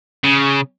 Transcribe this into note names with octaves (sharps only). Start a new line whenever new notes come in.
C#3